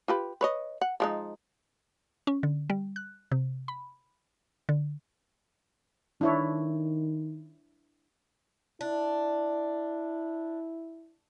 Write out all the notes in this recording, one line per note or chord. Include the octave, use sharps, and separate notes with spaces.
F4 G4 B4
B4 C#5 D#5
F#5
F3 G#3 D#4
C#4
D3
G3
F#6
C3
B5
D3
D#3 D4 E4 C#5
D4 E4